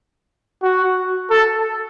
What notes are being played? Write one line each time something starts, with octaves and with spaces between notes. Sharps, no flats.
F#4
A4